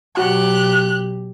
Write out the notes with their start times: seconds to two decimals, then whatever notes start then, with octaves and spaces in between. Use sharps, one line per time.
0.17 B2 F#3 F#4 G4 F#5 F#6